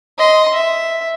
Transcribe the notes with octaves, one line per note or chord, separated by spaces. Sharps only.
D#5 C6
E5